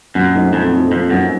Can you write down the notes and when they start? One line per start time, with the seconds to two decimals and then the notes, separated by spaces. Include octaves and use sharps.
0.15 F#2 A#2
0.35 F#3 A3 C4 D#4
0.53 F2 A#2
0.73 F#3 A3 C4 D#4
0.91 F2 A#2
1.10 F#2 F3 A#3 D#4 F#4